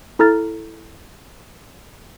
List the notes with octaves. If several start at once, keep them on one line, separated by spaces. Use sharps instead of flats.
E4 A4 A#5 F6 A6